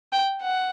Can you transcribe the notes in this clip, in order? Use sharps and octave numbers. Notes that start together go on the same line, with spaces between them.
G5
F#5